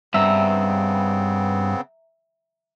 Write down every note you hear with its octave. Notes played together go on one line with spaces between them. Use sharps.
G2 C#3 B3 C4 E5 A#5 E6